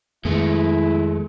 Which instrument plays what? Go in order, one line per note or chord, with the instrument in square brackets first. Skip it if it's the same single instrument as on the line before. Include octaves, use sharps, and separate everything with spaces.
[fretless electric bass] F2 D#3 B3 [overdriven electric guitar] G#3 A3 [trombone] E4